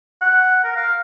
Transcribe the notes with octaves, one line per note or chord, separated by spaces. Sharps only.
F#5
A#4
F5